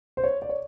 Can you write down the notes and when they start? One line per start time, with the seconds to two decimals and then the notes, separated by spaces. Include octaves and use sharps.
0.17 C5
0.24 C#5
0.42 D5
0.49 C#5